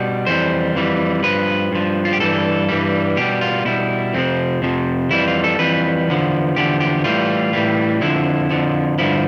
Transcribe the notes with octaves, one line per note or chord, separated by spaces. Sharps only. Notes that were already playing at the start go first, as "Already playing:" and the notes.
Already playing: B2 G3 B4
F2 E3 G3 C5
F2 E3 G3
G2 F3 B4
G2 F3
F4
G4
G2 E3 G3 A4
G2 E3 G3
B2 G3 G4
F4
B2 G3 E4
F2 C3 F3 C4
F2 C3 F3
F2 E3 G3 E4
F4
A4
F2 E3 G3 B4
E2 D3 F3
E2 D3 F3 G4
G4
A2 E3 G3 F4
A2 E3 G3
F2 D3 F3 E4
F2 D3 F3
G2 D3 F3 E4